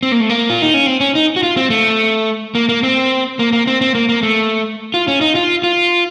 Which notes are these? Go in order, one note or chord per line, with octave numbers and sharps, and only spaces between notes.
C4
A#3
A3
A#3
F4
D#4
C#4
C4
C#4
D#4
F#4
F4
C4
A3
A#3
A#3
C4
A#3
A#3
C4
C4
A#3
A#3
A3
F4
C#4
D#4
F4
F4